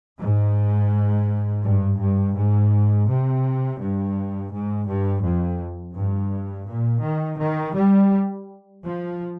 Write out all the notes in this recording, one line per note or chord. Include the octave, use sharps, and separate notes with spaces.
G#2
G2
G2
G#2
C3
G2
G#2
G2
F2
G2
A#2
D#3
D#3
G3
F3